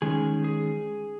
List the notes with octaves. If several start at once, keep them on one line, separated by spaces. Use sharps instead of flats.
D#3 G#3 C#4 G#4
G#4